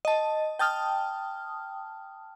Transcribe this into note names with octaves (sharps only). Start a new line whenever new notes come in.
D#5 A5
G5 A5 D#6 F6